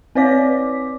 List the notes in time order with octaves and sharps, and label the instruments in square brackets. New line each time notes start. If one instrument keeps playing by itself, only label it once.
[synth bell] C4 B4 C#5 D5 D6 B6